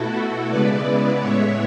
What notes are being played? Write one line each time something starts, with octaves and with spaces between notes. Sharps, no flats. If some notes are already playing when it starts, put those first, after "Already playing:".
Already playing: B2 A3 E4 F#4 A4
F#4 A4
C#3 G#3 B3 E4 B4 D5
A2 G#3 B3 E4 C#5 E5